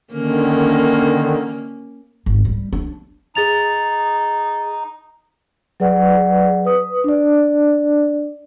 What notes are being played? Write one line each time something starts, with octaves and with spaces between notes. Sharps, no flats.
D3 D#3 A#3 C#4
G#1
G3
D4
D#4 G#4 A6 F7
F#3 G#4 B4 D5 F#5
B4 D#6
D4 D5